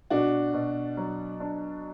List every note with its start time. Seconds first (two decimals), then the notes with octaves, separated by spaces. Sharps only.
0.10 B2 D4 F#4
0.54 B2
0.97 F#3
1.40 D4